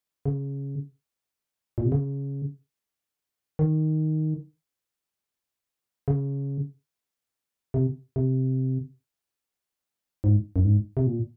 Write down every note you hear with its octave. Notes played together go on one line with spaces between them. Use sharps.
C#3
A#2
C3
C#3
D#3
C#3
C3
C3
G#2
F#2
G#2
C3
A#2